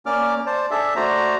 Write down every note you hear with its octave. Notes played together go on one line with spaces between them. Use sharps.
A#3 C#4 D5 D6 F6
C5 D5 A5
D4 G#4 A4 E5 A5
A3 F#4 C5 D5 A#5